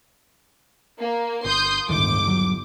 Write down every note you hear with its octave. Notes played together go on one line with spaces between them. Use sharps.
A#3
G1 C6 D#6 G6
G1 C#2 A2 D#3 D6
D#1 F#3